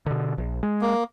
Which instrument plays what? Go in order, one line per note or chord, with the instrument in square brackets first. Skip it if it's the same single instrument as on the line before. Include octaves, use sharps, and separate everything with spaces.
[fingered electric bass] B2 D3
A#1
G#3
[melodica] A#3